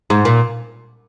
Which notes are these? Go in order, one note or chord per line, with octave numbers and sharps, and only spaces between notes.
G#2
A#2